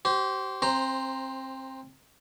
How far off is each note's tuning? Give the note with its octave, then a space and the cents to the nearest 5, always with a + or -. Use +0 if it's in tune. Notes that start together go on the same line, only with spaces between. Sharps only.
G4 -40 C5 +0
C4 +25 C5 +0 A#5 +0